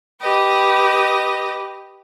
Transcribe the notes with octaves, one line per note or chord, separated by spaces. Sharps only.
G4 B4 D#5